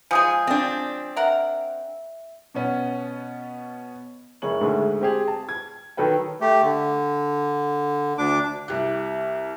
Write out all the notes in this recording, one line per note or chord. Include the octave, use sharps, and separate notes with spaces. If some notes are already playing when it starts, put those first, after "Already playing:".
F3 G#3 G#4 G#5 D#6 G6
C4 D4
A#4 E5 F#5
B2 B3 C#4
F#1 G#3 C#5 F#7
D2 G#2 G#3 A3
C4 G4 G#4
A5
G#6
D#3 F#3 A4 B4 G5
A3 G4
D3
D2 D4 D6
C2 G4 F#6